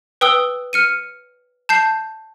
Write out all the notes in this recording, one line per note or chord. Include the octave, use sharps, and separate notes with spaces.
B4 G5 D#6 E6 G7
F6 C#7 D#7
A5 G6 C7